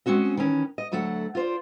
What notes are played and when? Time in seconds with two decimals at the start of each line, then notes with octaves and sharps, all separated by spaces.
0.06 G#3 C4 C#4 F#4 D#5
0.37 D#3 E3 C#4
0.78 D#5
0.92 D2 F#3 A3 A4 F#5
1.35 F4 C5 D5